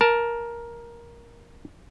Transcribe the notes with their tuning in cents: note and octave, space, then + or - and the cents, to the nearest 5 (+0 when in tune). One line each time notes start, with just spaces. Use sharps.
A#4 +10 A5 +0